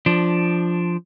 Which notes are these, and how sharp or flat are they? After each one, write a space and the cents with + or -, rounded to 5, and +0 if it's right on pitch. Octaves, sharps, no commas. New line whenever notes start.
F3 +0 D4 +0